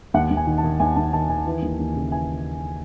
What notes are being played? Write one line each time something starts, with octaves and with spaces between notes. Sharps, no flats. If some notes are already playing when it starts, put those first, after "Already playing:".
D#2 F#5
D#2
G#5
D#3
A5
D#3
D#2 G#5
D#2 A5
D#3 A5
D#3 G#5
E3
D#2
D#2
C#3
E3 G#5